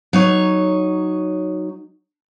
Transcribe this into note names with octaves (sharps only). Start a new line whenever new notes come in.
F#3 D#4 C#5